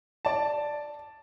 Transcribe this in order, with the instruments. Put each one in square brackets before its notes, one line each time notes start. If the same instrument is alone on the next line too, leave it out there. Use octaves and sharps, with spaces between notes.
[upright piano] D5 A5